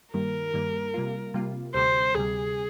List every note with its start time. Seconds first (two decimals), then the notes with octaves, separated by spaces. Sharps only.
0.14 G2 D#3 G3 A#3 A#4
0.54 G2 D#3 G3 A#3
0.94 C3 G3 A#3 F4
1.34 C3 G3 A#3 F4
1.74 D2 C3 G3 C5
2.15 D2 C3 G3 G#4